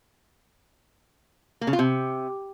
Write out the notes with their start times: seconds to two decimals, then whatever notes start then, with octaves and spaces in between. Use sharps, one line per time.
1.61 A#3
1.67 C#3
1.73 F4
1.79 C3